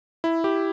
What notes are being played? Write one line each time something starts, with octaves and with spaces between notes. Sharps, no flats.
E4
G4